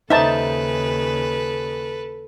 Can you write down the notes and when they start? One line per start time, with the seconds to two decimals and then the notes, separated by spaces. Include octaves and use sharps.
0.10 D#2 C#3 D#4 A4 B4 C5 E5 A5